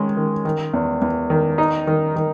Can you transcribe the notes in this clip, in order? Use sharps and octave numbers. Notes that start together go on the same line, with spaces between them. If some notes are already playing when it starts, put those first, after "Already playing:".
Already playing: D#3 G#3 C#4
D#3
D#3
E2
E2
D#3
D#4
D#3
D#3